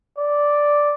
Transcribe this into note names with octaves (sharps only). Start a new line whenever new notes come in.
D5